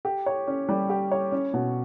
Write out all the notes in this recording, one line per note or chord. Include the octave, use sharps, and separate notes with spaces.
G4
C#5
C#4
G3
G4
C#5
C#4
B2